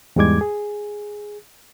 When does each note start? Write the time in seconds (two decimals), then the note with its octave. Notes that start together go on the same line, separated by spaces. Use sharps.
0.16 E2 G#2 G3 G#3 D6 G#6
0.41 G#4